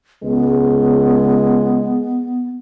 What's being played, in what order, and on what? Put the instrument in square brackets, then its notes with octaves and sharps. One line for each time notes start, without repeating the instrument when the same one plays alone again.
[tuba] C#2 [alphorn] G#3 [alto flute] B3